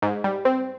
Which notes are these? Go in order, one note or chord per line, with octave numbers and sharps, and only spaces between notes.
G#2
G3
C4